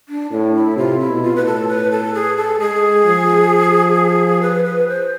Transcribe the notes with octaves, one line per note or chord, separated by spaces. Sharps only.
D4
A2 D4
E4
C3 F4
E4
B2
F4
A2 B4
A4
B4
A4
G#4
A4
G#3 G#4
F3
B4
B4
C5